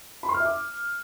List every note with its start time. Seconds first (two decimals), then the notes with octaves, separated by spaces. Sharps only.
0.23 B5
0.29 C6
0.34 F6
0.40 E5
0.46 D6